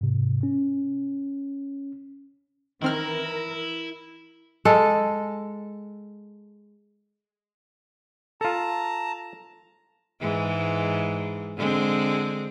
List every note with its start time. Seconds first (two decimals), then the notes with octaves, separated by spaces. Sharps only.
0.01 G#2 C3
0.43 C#4
2.82 D#3 E3 C4 E4 A#4 F6
4.65 G#3 A4
8.41 F4 A4 A5 A#5
10.20 G#2 E3 G#3
11.56 D3 G#3 C4